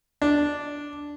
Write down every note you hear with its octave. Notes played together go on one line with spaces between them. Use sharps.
D4